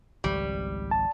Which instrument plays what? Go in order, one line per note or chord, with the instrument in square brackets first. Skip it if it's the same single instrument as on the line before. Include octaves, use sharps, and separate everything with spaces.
[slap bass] G#1 C#2 F3 [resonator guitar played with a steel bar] G3
[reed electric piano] A5